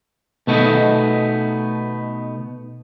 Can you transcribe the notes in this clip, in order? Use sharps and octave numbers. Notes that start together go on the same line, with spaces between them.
B2 A3 B3 D#4